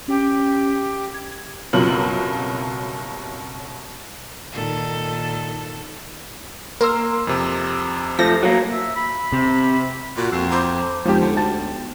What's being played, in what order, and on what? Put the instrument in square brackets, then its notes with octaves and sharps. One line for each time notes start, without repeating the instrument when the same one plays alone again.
[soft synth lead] C#4 [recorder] G4
[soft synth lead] G#6
[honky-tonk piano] F#1 C2 B2 F#3 F4 F#7
[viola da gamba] A#2 D#3 A4
[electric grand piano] A#3 C6 E6 [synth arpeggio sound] A#4
[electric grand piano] F2 C3
[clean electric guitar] F3 A3 [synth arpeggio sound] A#6
[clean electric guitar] F#3 A#3
[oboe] E5
B5
[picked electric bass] C3
[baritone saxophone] A#2 [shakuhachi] F#4
[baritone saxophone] F2 [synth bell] E6 C7
[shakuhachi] C5 [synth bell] A#5 B5 D6
[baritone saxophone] F2 [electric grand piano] F3 G4 [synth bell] G#3 B3 D#4
[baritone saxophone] D3
[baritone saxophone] D2 [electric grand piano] G5 A5 A6